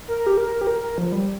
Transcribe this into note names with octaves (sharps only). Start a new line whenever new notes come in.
A#4
G4
A#4
G4
A#4
F3
G3